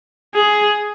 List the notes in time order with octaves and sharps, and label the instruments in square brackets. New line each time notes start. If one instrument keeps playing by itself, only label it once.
[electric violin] G#4